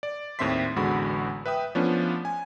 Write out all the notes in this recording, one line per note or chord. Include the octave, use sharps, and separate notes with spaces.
D5
D#2 A2 C4 E5 C6 B6
A1 E2 D3 G#3 F#4 B5
B4 E5 G5 D#6
F3 A3 B3 C#4 D4 F4
G#5